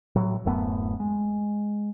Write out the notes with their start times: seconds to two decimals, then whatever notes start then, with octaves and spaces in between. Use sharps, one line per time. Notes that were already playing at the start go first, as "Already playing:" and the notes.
0.16 A2 F#3
0.45 D1 F#2 A3 B3
1.00 G#3